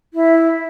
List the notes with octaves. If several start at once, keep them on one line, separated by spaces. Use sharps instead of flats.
E4